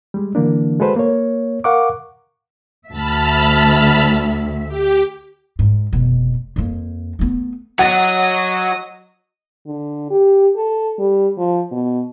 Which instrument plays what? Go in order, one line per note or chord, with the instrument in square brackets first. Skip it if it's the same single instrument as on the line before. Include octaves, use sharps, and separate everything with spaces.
[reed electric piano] G3 G#3
D3 E3 A#3 D4
G#3 F#4 A4 B4 C5
A#3 C#5
A#4 F5 F#5 C#6 D6
[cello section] D2 E5 [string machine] A5 B5 F6
[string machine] G4
[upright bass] G#2
F1 B2
F2 A#3
A3 B3
[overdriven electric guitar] F#3 [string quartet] D#5 [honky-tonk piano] F#5 A6
[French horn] D3
G4
A4
G3
F3
B2